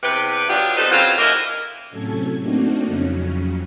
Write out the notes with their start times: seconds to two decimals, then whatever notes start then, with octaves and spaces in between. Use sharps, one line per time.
0.03 E2 C3 G4 B4
0.49 F#3 B3 D4 F4 G4
0.77 C4 D#4 A4 B4 C5
0.92 C#3 F#3 C4 F4
1.18 D#2 A#3 E4 A#4 D#5
1.89 A2 C3 F#3 C#4 A4 G#6
2.40 A3 A#3 C4 D4 D#4 F#4
2.85 F2 C#3 F#3 C#4